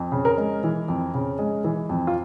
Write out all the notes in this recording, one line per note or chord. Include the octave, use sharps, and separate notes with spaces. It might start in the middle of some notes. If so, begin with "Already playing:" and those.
Already playing: F2
C#3
A#4
G#3
E3
F2
C#3
G#3
E3
F2
F4